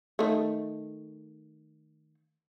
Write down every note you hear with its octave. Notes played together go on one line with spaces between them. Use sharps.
D#3 A3